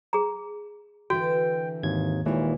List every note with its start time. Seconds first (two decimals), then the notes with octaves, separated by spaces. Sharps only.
0.13 G#4 A#5
1.10 D3 E3 F#4 B4 G5
1.83 G#1 D#2 G#6
2.25 D#2 A#2 E3 G#3 C#5